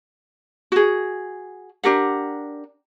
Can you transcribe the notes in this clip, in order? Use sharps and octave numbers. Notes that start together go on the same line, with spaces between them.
F#4 G#4
D4 G4 A#4 F#5